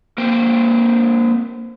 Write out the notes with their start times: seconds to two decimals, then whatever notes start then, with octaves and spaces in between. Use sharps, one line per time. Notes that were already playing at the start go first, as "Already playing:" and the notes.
0.18 A#3 C4 G5